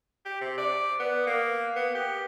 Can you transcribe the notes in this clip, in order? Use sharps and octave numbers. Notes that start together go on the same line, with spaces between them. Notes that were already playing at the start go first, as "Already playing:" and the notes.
G4
C3
D5
B3
A#3
B3
G4